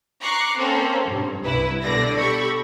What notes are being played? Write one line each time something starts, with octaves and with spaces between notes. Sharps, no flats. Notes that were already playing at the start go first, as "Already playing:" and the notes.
A#5 C#6 D6 F#6 C7
A#3 C4 C#4 A4 C5
G2
C2 E4 B4
B2 D3 G4 D5 A#6
G4 A4 B5 C#6